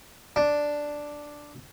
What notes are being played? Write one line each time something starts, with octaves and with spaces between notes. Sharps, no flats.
D4